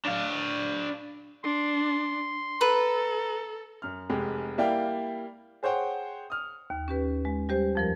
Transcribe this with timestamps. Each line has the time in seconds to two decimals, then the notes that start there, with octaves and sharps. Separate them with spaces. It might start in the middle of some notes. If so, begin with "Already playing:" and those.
0.06 D4 F5
1.44 D4 C6
2.61 A4 B4 A#5
3.82 F#2 F6
4.10 F1 G#3 G4
4.58 G3 A#3 E4 D5 F5 G5
5.63 G#4 C5 C#5 F#5 G5
6.30 D#6 F6
6.70 D#2
6.88 C#4 G4 B4
7.25 G#3
7.49 G3 G4 C5
7.75 F2 F3 A#4